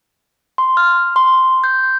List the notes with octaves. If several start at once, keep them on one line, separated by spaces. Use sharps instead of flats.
C6
F6
C6
G6